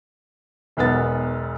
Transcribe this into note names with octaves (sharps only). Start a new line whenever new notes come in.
E1 B1 B3 A6